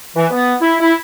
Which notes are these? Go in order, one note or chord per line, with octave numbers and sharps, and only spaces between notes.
E3
B3
E4
E4